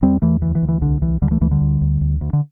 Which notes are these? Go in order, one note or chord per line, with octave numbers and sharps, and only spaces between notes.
E2 G3 C4
E2 E3 A3
D2 E3
E3
D2
E3
C2 D3
C2 E3
D2 D3 G3
E3 A3
D2 E3 A3
D3 G3
D2
D2
D2
D2
D3